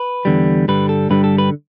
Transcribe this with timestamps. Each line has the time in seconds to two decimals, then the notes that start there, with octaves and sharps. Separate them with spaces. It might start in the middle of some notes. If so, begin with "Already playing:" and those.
Already playing: B4
0.25 E2 D3 G3
0.68 G2 D3 G3 B4
0.89 A4
1.10 G2 D3 G3 B4
1.24 A4
1.38 B4